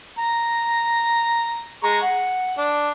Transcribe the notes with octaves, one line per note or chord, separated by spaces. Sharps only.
A#5
G#3 A#5 C#6
F#5
D4